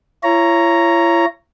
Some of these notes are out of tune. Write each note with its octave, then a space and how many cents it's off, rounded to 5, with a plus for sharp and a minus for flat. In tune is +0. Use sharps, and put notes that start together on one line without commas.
E4 +45 C#5 +0 A#5 +0